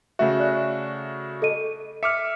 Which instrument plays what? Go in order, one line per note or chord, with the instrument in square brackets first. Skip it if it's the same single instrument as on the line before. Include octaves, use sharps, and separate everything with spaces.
[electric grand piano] C#3 A3 F#4 [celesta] E5
[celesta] D5 F#6
A4 D#5 D#7
[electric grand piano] E5 D6 F6 [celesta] C#7